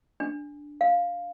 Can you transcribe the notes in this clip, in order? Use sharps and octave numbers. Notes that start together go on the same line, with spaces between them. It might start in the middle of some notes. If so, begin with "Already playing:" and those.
D4
F5